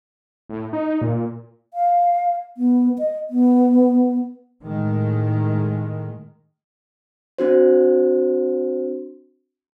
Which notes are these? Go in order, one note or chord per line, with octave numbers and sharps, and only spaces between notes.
A2
D#4
A#2
F5
B3
D#5
B3
A2 D#3 G#3
C4 D4 F#4 C5